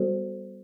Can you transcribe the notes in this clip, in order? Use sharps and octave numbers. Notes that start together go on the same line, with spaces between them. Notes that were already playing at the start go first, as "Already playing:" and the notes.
Already playing: G3 B3 F#4 A4 C5